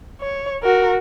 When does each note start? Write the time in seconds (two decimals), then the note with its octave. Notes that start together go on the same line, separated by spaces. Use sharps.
0.21 C#5
0.63 F#4 A#4